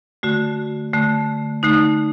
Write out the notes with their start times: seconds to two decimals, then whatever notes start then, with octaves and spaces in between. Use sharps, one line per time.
0.23 D3 A3 F#4
0.93 D3 A3
1.63 D3 A3 D#4